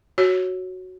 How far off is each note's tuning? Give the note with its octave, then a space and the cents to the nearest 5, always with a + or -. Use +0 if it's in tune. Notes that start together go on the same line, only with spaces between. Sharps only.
F#4 +0 C#5 -10